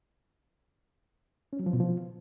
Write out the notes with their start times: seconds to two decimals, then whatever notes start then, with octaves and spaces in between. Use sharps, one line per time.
1.53 C#4
1.59 F#3
1.66 F3
1.73 B2
1.80 F3